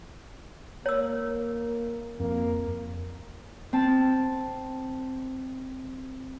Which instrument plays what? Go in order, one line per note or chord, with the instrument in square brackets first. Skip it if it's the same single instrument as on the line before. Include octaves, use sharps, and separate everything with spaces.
[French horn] A#3 [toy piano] C#5 E6
[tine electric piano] F2 [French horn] A#3
[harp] C4 A5